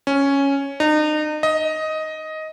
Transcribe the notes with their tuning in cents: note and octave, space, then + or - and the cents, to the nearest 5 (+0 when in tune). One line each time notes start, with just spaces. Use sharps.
C#4 +0
D#4 -35
D#5 +10